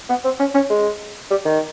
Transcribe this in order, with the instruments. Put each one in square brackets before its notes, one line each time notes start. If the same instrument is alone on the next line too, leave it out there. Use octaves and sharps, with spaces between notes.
[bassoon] B3
C4
C#4
C#4
G#3
G3
D#3